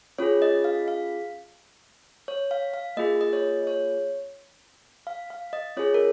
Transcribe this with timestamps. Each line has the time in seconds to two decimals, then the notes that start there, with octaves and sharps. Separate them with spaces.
0.18 C#4 F4 G#4 C#5
0.42 D#5
0.64 F5
0.88 F5
2.28 C#5
2.51 F5
2.74 F5
2.97 A#3 F4 G#4 D#5
3.21 D#5
3.33 C#5
3.67 C#5
5.07 F5
5.30 F5
5.53 D#5
5.77 C#4 F4 G#4 C#5
5.94 A#4